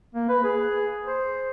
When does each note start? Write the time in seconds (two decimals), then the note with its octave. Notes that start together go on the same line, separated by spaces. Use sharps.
0.15 A#3
0.29 B4
0.44 G#4
1.06 C5